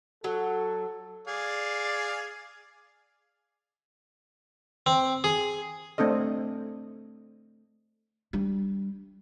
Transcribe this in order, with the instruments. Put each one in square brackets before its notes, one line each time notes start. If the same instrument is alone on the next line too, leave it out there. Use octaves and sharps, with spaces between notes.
[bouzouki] F#3 [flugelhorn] A4
[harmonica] G#4 D5 F5
[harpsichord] C4
G#4
[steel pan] A3 C4 D4 A4 D#5
[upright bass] G3 D4